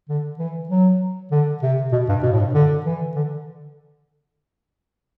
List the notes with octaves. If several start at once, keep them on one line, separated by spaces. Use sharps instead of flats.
D3
E3
F#3
D3
C3
B2
G2
B2
A2
G2
D3
E3
D3